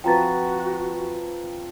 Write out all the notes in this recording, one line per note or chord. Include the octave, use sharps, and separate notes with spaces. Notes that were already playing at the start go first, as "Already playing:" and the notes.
F3 C4 F#4 B4 G5 A#5 A6